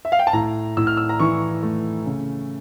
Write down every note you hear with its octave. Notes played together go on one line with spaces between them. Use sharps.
E5
F5
G5
A5
A2 A#5
A2 E6
F6
E6
A#5
E3 C#6
A3
C#3